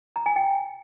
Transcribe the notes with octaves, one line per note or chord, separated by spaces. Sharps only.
A#5
G#5
G5